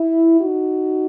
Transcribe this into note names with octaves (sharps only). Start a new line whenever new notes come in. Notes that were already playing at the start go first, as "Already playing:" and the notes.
Already playing: E4
D#4 F#4